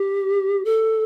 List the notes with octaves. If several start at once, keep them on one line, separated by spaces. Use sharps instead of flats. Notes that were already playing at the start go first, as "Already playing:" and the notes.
Already playing: G4
A4